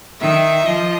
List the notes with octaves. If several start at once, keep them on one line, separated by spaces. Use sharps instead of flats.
D#3 E5
F3 D#5